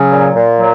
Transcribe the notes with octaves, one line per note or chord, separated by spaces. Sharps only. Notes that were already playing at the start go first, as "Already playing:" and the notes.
Already playing: C#3 F#3 C#4
A#2
A#2
F#3